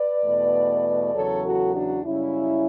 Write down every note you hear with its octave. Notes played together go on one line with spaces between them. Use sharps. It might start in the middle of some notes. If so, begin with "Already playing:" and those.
Already playing: B4 D5
E2 B2 A3
E2 C#3 F#3 A4 C#5
F#4 A4
D4 F#4
F#2 C#3 G3 C#4 E4